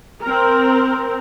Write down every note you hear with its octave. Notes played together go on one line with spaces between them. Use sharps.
C4 A#4